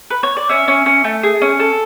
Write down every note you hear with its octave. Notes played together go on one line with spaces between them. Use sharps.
B4
C#5
D5
C#4 E5
C#4
C#4
A3
G#4
C#4
A4